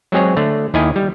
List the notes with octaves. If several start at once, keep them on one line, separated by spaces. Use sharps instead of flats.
F#3 G#3 C4 G#4 C#5
D3 A3
D#2 D#3 E4 D#5 G#5
G3